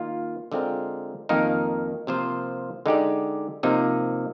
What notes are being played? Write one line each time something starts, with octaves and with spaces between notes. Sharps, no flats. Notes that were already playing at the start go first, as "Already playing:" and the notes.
Already playing: D#3 A#3 F4
D3 G#3 C4 F4 A#4
F2 D#3 A#3 D#4 A#4
C3 F3 A#3 F4 C5
D3 G#3 D#4 G4 D5
C3 F3 A#3 D#4